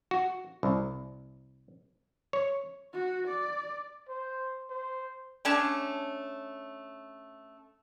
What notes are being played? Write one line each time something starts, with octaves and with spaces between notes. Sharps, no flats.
F#4
C2
C#5
F#4
D5
C5
C5
A3 C#4 D4